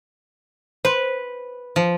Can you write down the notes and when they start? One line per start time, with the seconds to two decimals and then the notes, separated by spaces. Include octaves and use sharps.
0.85 B4 C5
1.76 F3